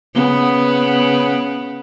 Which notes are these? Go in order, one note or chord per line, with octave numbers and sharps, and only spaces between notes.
C#3 B3